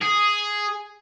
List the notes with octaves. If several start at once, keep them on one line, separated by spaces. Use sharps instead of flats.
G#4